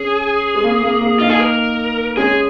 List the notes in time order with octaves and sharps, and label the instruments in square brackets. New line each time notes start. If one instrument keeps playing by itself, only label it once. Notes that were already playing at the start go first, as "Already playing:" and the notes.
Already playing: [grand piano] C#4 [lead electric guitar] G#4
[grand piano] G#3
A#3
A#3
A#3
[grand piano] A#3 D#4 [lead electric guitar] F4
[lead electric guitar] G#4
A#4
[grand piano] G#3 C#4 [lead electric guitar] G#4